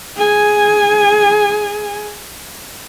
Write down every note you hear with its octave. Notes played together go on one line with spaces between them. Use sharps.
G#4 G#5